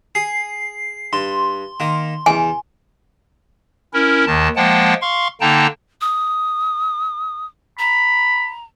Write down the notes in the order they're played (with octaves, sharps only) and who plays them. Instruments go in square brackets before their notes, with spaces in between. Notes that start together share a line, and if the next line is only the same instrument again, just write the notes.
[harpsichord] G#4 [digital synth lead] C7
[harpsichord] G2 [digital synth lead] C6
[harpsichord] D#3 A#3
[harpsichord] E2 [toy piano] G#5
[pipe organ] C#4 E4 A#4
D#2 D#3 A5
F3 G#3 A#3 F#5 G5 A5
F5 C6 C#6
D3 A#3 D#4 G5 A5 A#5
[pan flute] D#6
[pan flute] A#5 [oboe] B5